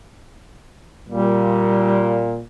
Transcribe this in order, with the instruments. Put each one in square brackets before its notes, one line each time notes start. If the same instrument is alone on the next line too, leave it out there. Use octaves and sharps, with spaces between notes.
[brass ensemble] A#2 [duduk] G3